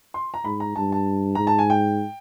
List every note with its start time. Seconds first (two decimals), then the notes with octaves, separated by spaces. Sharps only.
0.14 C6
0.34 A#5
0.45 G#2 B5
0.60 A#5
0.76 G2 A5
0.92 A5
1.35 G#2 A#5
1.47 A5
1.59 G#5
1.70 G5